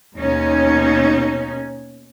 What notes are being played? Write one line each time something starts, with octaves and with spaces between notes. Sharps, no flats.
D#2 B2 C#4 D#4